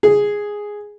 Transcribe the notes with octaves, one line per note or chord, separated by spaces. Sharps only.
G#4